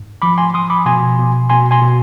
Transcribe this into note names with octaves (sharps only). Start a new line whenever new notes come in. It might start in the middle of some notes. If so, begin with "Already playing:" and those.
Already playing: G#2
F3 B5 D6
G#5 C6
F3 C6 D#6
B5 D6
B2 G#5 C6
B2
B2 G#5 C6
G#5 C6
B2